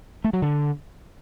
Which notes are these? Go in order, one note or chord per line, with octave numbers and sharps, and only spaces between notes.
A3
F#3
D3